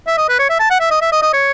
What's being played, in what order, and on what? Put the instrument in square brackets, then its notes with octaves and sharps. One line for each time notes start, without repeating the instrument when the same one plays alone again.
[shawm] E5
D#5
B4
C#5
E5
A5
F#5
E5
D#5
E5
D#5
D#5
C#5